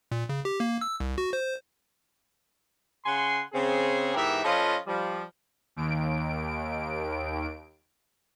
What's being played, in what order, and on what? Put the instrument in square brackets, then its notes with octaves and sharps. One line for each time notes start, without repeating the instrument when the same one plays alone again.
[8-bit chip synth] A#2
C#3
G4
A#3
E6
C2
F#4
C5
[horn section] C#3 F#5 G#5 C6
C#3 C4 G#4
G#2 E3 B3 G4 A#4 E5
F3 C#4 F4 A4 B4 D#5
F3 G3
[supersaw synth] D#2 D7